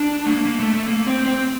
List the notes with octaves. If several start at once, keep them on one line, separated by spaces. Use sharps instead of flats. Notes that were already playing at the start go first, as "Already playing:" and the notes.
Already playing: D4
A3
A#3
A#3
A3
A3
A#3
C4
C4